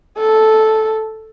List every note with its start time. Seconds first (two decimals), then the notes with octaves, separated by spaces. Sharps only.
0.18 A4